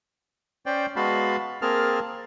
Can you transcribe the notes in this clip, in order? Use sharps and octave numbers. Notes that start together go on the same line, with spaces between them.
C#4 C5 D5 G5
G#3 B3 F#4 F5 A5 B5
A#3 C4 G#4 A#4 A5 F6